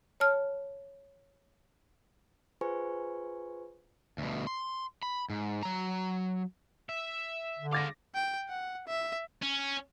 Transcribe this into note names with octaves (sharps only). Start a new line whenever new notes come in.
C#5 A5 F6
F4 G#4 B4 C5 G#5 C#6
D2 B2
C6
B5
G#2
F#3 A#5
E5
D3
G#3 F5 D6 A6 A#6
G5
F#5
E5
C#4